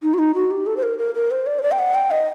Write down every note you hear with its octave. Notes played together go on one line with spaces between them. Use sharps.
D#4
F#4
D#4
F#4
G4
A4
C5
A#4
A#4
A#4
C5
D5
C5
D5
G5
F#5
G5
D#5